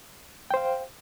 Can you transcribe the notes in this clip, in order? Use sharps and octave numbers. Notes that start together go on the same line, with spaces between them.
C5 F5 G5